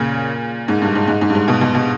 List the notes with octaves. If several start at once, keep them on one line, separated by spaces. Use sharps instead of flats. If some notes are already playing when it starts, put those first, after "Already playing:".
Already playing: A#2 C#3
G#2
G2
G#2
G#2
G#2
G2
G#2
B2
B2
B2